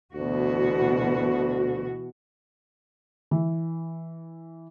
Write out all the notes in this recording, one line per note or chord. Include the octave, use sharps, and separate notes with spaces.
D2 B2 E3 F#4
E3